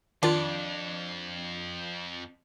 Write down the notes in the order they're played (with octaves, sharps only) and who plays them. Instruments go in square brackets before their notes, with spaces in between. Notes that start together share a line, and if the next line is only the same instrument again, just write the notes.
[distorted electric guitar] F2 [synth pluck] D#3 F4 [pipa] D4